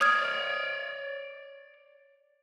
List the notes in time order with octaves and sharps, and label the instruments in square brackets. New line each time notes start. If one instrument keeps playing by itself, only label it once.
[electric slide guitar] C#5 D5 [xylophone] D#6 F6 G#6